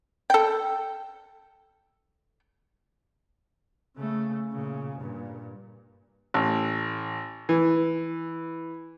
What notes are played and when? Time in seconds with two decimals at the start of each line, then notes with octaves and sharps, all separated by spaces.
0.30 A4 G5
3.97 C#3 A3
4.52 A#2 C#3
4.98 G2 A#2
6.34 A1
7.49 E3